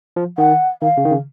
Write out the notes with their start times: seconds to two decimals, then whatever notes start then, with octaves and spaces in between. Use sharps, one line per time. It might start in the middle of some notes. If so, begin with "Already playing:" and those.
0.16 F3
0.38 D#3 F#5
0.82 D#3 F5
0.97 C#3
1.05 D#3
1.11 C#3